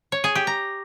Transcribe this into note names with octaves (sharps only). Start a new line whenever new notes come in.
C#5
G#4
G4
A#5